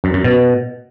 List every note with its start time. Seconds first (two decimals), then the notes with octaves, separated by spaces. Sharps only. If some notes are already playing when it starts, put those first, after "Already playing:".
0.04 F#2
0.14 F#2
0.24 B2